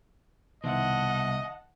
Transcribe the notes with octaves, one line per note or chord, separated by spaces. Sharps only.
C2 B2 D#3 C5 D#5 E5 F#5 A5